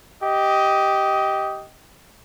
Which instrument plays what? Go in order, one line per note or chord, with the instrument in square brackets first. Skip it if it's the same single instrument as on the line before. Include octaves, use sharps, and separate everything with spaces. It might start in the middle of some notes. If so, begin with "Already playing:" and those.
[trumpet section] G4 D#5